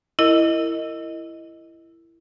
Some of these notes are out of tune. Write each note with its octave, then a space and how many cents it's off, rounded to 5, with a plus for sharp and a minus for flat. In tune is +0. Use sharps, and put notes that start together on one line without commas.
E4 +15 A#4 -30 D#5 +0